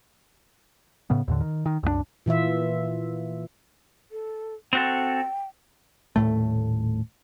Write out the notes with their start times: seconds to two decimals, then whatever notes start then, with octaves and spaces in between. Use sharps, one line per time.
1.10 A2 C#3 B3
1.28 D#2 A2 D3
1.41 D#3
1.66 D#3
1.83 C2 F#2 E3 D4
2.26 A#2 E3 F4 E5
4.11 A4
4.73 C4 F#4 A4 G5
6.16 D#1 F#2 A2 A3